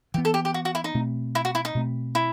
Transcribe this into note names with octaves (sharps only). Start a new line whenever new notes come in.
E3 B3 G4
A4
G4
G4
F#4
F#4
E4
D#4
B2 A3 C4
E4
F#4
E4
D#4
B2 A3 C4
E4